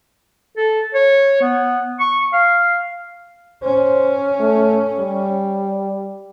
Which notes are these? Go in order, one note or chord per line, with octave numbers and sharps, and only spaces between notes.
A4
C#5
B3
C#6
F5
C#4 C5
A3
G3